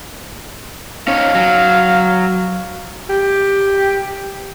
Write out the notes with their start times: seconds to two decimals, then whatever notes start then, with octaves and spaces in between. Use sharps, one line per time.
1.08 C#4 D#4 C#5 F5
1.35 F#3
3.09 G4